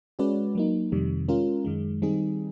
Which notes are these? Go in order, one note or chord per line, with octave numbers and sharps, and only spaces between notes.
G#3 C#4 F#4 B4 D5
F#3 A#3 D#4
F2 C3 D#3 G3
G#3 C#4 F4 A#4
F#2 D#3 G#3
D#3 G3 C4 D#4 G#4